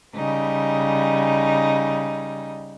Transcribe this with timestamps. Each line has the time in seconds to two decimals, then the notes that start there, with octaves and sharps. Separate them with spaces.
0.15 C#3 G3 D#4